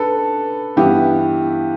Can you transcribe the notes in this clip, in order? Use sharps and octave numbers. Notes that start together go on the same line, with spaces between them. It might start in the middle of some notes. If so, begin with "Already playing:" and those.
Already playing: D4 A4 B4
G2 E3 B3 E4 G4